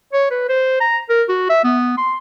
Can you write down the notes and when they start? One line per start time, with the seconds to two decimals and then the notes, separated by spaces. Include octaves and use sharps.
0.13 C#5
0.30 B4
0.49 C5
0.80 A#5
1.09 A#4
1.28 F#4
1.49 E5
1.64 B3
1.97 C6